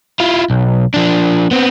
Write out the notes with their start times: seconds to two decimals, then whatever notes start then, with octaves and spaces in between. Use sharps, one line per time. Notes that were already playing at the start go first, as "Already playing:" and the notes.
0.20 E4 F4
0.50 B1
0.94 F3 D4
1.51 B3 C4